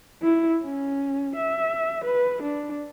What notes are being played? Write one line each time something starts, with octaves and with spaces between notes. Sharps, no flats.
E4
C#4
E5
B4
D4